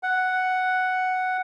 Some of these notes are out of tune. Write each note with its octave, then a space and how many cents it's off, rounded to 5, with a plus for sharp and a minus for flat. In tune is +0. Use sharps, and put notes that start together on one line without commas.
F#5 +5